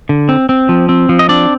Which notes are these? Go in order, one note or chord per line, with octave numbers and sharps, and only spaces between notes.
D3
C4
C4
F3
C4
F3
D#5
C4 D4 D5